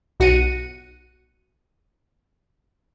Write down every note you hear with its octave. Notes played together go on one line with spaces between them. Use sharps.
B1 F#4 C#7 D#7